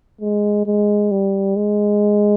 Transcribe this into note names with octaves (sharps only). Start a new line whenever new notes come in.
G#3
G#3
G3
G#3